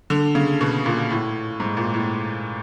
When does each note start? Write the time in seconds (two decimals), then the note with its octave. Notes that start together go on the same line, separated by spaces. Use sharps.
0.10 D3
0.35 C#3
0.61 B2
0.86 A#2
1.10 A2
1.60 G#2
1.77 A#2
1.94 A2